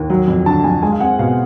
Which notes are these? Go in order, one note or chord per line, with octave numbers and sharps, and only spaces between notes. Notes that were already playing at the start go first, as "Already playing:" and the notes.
Already playing: D#2
F#3
F2
D3 A5
F2 G#5
G#3 G#5
F5
C4 F#5
B2 F5